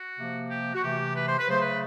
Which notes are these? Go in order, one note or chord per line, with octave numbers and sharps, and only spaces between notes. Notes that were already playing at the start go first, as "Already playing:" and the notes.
Already playing: F#4
C3 F3 A#3
G4
F#4
C3 E3 A3 G4
B4
C5
B4
C#3 F#3 A3 C5
B4